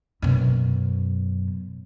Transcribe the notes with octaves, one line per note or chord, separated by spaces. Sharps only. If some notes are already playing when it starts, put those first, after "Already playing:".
F#2 B2